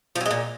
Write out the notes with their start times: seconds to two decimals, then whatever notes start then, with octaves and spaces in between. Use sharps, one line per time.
0.16 F3
0.21 F#3
0.26 G#3
0.31 A#2